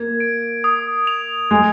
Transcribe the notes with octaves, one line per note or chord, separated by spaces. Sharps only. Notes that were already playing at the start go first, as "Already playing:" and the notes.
Already playing: A#3 G#6
D7
D#6
F7
G#3 G#6